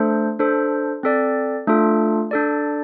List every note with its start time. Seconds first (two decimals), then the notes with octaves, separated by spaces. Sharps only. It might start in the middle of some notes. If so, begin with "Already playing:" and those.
Already playing: A3 D4 A4 C5
0.39 D4 A4 C5
1.03 C4 A4 D5
1.67 A3 D4 F4 A4
2.31 D4 A4 D5